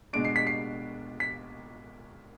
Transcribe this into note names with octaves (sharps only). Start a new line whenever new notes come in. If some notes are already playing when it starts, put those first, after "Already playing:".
B2 G#3 D4 D7
C7
B6
C7
B6